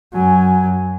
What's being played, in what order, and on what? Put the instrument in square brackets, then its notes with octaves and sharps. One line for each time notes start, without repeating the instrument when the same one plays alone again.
[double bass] F#2 F#3 [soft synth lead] G#5